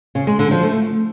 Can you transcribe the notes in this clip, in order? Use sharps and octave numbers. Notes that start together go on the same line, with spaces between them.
C#3
G#3
D3
F3
A3